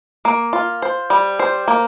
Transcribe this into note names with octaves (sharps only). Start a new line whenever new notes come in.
A#3
F4
C5
G3
C5
A#3